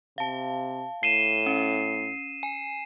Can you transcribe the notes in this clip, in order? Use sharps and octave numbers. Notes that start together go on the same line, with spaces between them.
C3 F5 A5
A2 C7 D#7 E7 G7
C#4
G#5